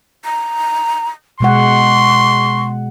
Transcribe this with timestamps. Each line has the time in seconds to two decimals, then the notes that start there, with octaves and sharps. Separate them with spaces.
0.25 A#5
1.40 B2 G#3 F#5 C6 C#6